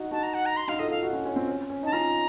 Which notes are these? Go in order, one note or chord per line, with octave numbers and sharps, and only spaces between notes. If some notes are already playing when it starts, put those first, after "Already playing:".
Already playing: D#4 F#4
D#4 F#4 A5
A#5
F#5
A#5
C6
D#4 F#4 F5
F4 A4 D#5
F4 A4 F5
D#4 F#4
C#4 F4
C#4 F4
C4
C#4
C#4
D#4 A5
C#4 F4 A#5